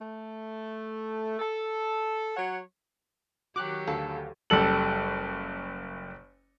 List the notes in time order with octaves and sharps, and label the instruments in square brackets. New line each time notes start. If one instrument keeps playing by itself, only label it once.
[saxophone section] A3
A4
F#3 C#5 F#5
[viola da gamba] D#3 F#3 G4 [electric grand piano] F#4 [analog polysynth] D6 F#6
[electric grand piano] D2 [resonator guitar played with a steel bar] A4 [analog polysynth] F5
[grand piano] F#1 G3 A4 F#7